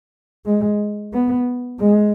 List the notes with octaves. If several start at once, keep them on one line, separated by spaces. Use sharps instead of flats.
G#3
B3
G#3